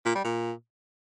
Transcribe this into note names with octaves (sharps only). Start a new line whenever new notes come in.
A#2
G3
A#2